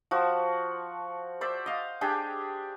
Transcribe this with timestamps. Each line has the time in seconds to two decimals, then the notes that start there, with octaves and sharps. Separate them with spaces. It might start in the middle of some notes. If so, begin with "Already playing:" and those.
0.11 F3 F#4
1.41 C5 D5 E5
1.66 D#5 F5
2.01 D4 G4 G#4 G5